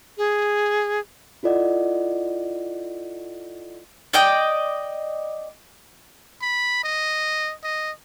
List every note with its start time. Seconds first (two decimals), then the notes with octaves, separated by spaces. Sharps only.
0.18 G#4
1.43 E4 F4 A4 D5 D#5 F#5
4.13 D5 D#5 G5
6.42 B5
6.84 D#5
7.64 D#5